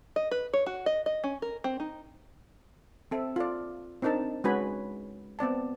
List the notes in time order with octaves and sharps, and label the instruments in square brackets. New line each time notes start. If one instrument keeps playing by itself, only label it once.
[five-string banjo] D#5
B4
C#5
F#4
D#5
D#5
C#4
A#4
C4
D#4
[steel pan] C4 A4 E5
F4 A4 D5
C4 D4 D#4 A#4 A5
G#3 C#4 F#4 B4 G#5 B5
B3 C4 D5 A5